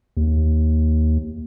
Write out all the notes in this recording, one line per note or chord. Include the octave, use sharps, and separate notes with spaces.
D#2